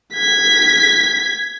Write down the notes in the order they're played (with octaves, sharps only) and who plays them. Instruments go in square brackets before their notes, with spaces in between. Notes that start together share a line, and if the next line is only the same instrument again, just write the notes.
[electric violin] G#6 B6